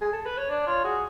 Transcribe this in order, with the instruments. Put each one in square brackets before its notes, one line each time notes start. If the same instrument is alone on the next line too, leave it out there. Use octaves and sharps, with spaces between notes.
[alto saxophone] G#4
A4
B4
C#5
[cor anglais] D4 [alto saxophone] D5
[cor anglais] F4 [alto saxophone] C#5
[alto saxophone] F#4 [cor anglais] G#4